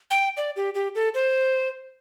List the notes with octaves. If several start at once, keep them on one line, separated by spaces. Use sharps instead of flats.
G5
D5
G4
G4
A4
C5